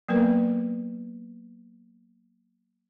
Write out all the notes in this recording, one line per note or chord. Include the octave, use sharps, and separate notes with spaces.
F#3 A#3 B3 A#4 B4